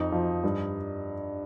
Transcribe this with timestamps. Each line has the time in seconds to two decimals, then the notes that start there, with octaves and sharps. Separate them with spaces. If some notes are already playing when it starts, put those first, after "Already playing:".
Already playing: F2 D#4
0.12 F3
0.44 G2